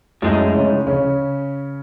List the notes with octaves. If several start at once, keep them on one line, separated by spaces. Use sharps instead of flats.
F#2 A2 F#3 G#3 D#4
C#3 C#4
C#3 C#4